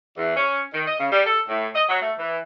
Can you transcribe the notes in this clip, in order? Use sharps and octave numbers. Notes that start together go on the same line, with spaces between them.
E2
C#4
D#3
D#5
C#3
G3
A4
A2
D#5
F#3
A3
E3